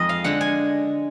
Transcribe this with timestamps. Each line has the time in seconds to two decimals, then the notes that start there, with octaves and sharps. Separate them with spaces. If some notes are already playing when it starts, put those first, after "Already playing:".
Already playing: F2 G#3 D#5
0.09 F5
0.24 D3 G#3 F#5
0.41 G#5